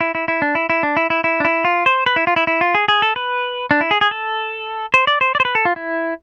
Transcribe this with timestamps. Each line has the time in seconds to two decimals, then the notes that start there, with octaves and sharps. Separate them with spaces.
0.01 E4
0.15 E4
0.28 E4
0.42 D4
0.55 E4
0.70 E4
0.83 D4
0.97 E4
1.10 E4
1.24 E4
1.40 D4
1.45 E4
1.65 F4
1.86 C5
2.06 B4
2.16 E4
2.27 F4
2.36 E4
2.47 E4
2.61 F4
2.75 G#4
2.88 G#4
3.02 A4
3.16 B4
3.71 D4
3.81 E4
3.91 G#4
4.01 G#4
4.11 A4
4.94 C5
5.07 D5
5.21 C5
5.35 D5
5.40 C5
5.45 B4
5.55 A4
5.65 F4
5.76 E4